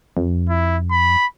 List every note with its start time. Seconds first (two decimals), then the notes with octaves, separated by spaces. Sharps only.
0.17 F2
0.49 E4
0.91 B5